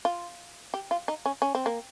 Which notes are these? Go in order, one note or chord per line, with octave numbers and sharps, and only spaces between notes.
F4
G4
F4
D#4
C#4
C#4
C4
A#3